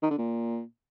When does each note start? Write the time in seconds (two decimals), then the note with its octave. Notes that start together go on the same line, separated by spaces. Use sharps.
0.03 D#3
0.10 D3
0.18 A#2